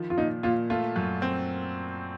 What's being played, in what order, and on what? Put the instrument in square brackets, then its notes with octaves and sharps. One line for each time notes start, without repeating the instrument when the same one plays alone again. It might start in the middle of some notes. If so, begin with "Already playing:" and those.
Already playing: [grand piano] D#3 F3
[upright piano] F4
[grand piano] A#2 [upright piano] D#4
[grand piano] A#2 [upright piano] F4
[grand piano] A3 [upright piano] F4
[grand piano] F#2
C4